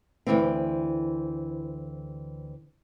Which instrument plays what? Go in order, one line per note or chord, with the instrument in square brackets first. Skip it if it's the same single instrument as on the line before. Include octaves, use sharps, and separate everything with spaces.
[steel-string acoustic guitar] D2 G2 E3 C4